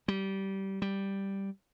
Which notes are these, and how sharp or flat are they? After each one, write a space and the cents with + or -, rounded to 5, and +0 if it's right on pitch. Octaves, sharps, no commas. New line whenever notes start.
G3 -20
G3 +0